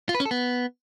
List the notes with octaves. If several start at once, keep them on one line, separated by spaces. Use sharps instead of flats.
F4
B4
C#4
A4
B3